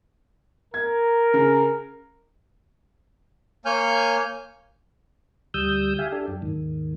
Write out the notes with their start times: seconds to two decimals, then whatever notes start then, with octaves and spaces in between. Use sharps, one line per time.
0.74 A#4 G#6
1.34 C#3
3.66 A#3 C#5 G#5 F6 G6
5.54 D2 G3 D#6 E6 G6
5.99 G4 E5 F5 G#5
6.12 D4 G4 A4
6.28 F#2
6.42 D#2 G#2 D#3